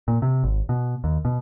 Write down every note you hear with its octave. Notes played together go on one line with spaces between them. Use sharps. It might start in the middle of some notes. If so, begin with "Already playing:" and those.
A#2
C3
G#1
B2
D#2
B2